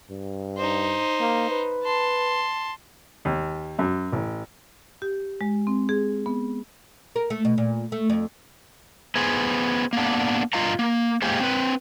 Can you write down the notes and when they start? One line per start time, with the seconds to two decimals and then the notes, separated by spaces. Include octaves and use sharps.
0.10 G2
0.57 D#4 C5
1.20 A#3
1.50 B4
1.84 A5 C6
3.25 D#2
3.79 F#2
4.12 A1
5.02 G4
5.41 G#3
5.67 C4
5.89 G#4
6.26 B3
7.16 A#4
7.30 A3
7.45 B2
7.58 A#2
7.92 A3
8.10 F2
9.16 B3 G#4 C5
9.93 A#3 B3 D4
10.53 G2 F4 D#5 F5 A#5
10.79 A#3
11.22 G#3 A#3 G4 G#4 C5
11.40 C4 B4